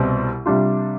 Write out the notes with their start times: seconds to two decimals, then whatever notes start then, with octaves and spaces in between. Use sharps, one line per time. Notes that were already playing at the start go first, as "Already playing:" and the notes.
Already playing: C2 B2 G3 C4
0.46 C3 G3 D4 F4